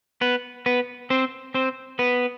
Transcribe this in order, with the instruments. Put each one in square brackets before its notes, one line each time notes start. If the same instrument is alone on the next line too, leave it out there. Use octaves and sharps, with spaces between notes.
[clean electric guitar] B3 B4
B3 B4
C4 C5
C4 C5
B3 B4